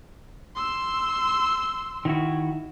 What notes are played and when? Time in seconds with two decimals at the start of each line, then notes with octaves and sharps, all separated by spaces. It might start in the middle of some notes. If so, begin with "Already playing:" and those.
0.56 C6 E6
2.05 D#3 E4 F#4